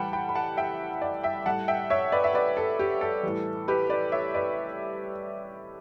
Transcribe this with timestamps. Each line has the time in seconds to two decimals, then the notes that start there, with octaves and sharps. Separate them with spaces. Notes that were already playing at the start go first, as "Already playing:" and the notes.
Already playing: A2 E3 G3 F#5 G5 A5 B5
0.13 G5 B5
0.29 B5
0.35 F#5 A5
0.57 E5 G5
1.02 D5 F#5
1.24 E5 G5
1.46 A2 G3 F#5 A5
1.68 E5 G5
1.90 C#5 E5
2.12 B4 D5
2.24 E5
2.34 B4 D5
2.57 A4
2.79 G4
3.01 A4
3.23 A2 E3 G3
3.68 G4 B4
3.90 B4 D5
4.12 C#5 E5
4.34 B4 D5